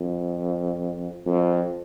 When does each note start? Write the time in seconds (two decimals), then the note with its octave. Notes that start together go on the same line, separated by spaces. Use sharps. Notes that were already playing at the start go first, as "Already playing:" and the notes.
Already playing: F2
1.26 F2